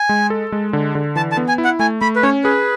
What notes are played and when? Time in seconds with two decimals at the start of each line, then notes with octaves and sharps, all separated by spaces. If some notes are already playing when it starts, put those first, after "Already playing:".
Already playing: G#5
0.09 G#3
0.30 A4
0.52 G#3
0.73 D3
0.95 D3
1.16 E3 A5
1.32 A5
1.37 B3
1.48 G#5
1.58 E4
1.64 F#5
1.79 A3 G#5
2.01 A3 B5
2.16 B4
2.23 C#4 C#5
2.44 G#4 B4